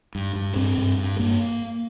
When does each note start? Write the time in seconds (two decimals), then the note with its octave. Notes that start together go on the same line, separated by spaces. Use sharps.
0.15 G2
0.35 G2
0.56 G2 C4
0.78 G2
0.98 G2
1.19 G2 A#3